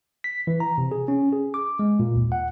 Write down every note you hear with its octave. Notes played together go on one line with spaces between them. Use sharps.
B6
E3
A#5
C3
G#4
C#4
G#4
D6
G#3
A#2
D#2
F#5